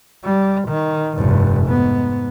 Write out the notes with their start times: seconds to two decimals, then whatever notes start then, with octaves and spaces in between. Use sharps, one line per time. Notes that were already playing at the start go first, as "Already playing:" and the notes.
0.24 G3
0.69 D#3
1.18 F1 G2
1.67 G#2 B3